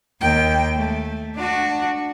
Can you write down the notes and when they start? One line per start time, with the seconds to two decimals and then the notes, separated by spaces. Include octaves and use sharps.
0.21 D#2 G5
0.75 A3
1.35 D4 F#4